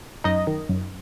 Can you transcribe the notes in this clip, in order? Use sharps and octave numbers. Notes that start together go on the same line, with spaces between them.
F#2 D#4 D#5
D#3
F#2